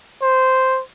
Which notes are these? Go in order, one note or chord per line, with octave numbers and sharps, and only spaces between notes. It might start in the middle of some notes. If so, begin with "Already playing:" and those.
C5